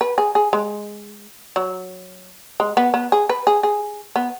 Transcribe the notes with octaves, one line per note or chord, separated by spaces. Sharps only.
B4
G#4
G#4
G#3
F#3
G#3
B3
B3
G#4
B4
G#4
G#4
B3